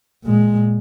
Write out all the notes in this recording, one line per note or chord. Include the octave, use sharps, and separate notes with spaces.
A#2 G#3